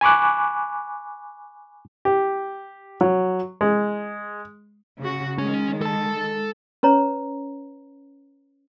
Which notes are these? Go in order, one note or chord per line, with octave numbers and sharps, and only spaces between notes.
G#5 B5 C#6 D6 F#6
G4
F#3
G#3
C#3 F#4
D#3 G#3 C#4
A4 A5
C#4 B4 C#5 A#5